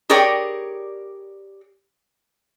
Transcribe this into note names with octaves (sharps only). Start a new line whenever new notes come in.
G4 G#4 A#4 C#5 D5 G5